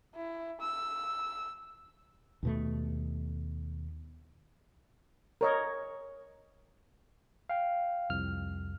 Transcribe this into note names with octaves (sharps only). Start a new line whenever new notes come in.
E4
E6
D#2 B2 A3
A#4 C#5 D#5
F5 G5
C2 F2 F6